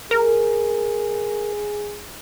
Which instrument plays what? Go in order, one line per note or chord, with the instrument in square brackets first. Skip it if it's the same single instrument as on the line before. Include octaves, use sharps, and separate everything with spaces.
[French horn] G#4 [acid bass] A#4